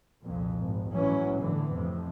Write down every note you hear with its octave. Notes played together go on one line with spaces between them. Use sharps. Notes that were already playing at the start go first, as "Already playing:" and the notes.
C2 F2 A#2
G#1
A2 E3 F#3 C#4
G1 A2 D3 E3
F2 A2 C3